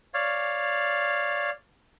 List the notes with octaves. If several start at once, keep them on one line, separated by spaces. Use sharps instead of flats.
C#5 D5 F5